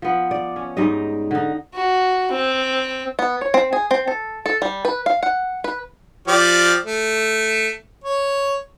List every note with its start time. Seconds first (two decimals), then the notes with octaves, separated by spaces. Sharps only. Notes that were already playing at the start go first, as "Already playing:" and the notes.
0.02 F3 B3
0.31 D5
0.56 C#4
0.77 G#2 G3 D#4 D#5
1.31 D3 D#4
1.74 F#4
2.32 C4
3.19 B3
3.41 C#5
3.54 C4
3.73 G#4
3.91 C4
4.08 A4
4.46 A4
4.62 G3
4.85 B4
5.06 F5
5.23 F#5
5.64 B4
6.28 F3 G4 D5
6.86 A3
8.04 C#5